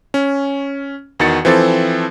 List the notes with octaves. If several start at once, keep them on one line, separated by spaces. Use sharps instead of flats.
C#4
E2 D#3 F#4 F#5 A6 C#7
E3 F3 C4 A4 A6